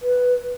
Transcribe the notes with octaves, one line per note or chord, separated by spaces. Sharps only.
B4